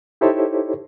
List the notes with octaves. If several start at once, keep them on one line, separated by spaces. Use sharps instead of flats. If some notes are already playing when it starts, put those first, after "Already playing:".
D#4 E4 G4 A4 C5 C#5